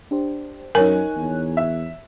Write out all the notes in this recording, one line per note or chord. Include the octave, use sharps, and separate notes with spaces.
D4 G4 C5
F#2 D#4 A#4 C#5 G#5 F#6
E2
E5